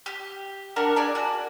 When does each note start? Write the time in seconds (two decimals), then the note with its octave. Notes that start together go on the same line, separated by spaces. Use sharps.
0.06 G4
0.76 D4 A#4 F#5 A#5
0.96 D4 G#4 D5
1.15 F#4